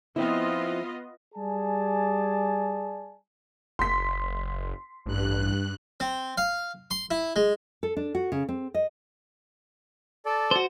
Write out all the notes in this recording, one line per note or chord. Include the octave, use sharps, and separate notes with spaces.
F3 B3 C4 E4 F4 D#5
G3 G#4 D5 G#5 A5
F#1 C6 B6
A1 G2 F#6
C4
F5
C6
E4
G#3
A4
D4
F#4
C#3
C4
D#5
A4 D5
F#4 C5